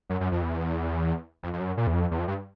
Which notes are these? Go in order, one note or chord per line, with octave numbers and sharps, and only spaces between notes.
F#2
F#2
F2
E2
F2
F2
F#2
A#2
E2
F2
E2
F2
G2